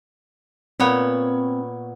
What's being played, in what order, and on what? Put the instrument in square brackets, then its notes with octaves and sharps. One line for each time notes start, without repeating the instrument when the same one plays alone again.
[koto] A#2 B3 C#5 [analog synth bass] C4